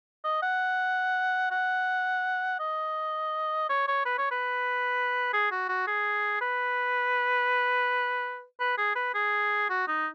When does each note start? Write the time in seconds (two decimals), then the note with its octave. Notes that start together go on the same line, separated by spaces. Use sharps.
0.24 D#5
0.43 F#5
1.51 F#5
2.59 D#5
3.69 C#5
3.88 C#5
4.06 B4
4.18 C#5
4.31 B4
5.33 G#4
5.51 F#4
5.69 F#4
5.87 G#4
6.42 B4
8.60 B4
8.78 G#4
8.96 B4
9.15 G#4
9.70 F#4
9.88 D#4